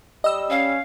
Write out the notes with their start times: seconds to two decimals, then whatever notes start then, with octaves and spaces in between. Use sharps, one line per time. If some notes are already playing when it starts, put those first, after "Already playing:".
0.24 G3 D#5 E6
0.50 C#4 F5